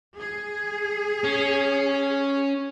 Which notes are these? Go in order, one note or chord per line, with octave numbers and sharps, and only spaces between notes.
G#4
C#4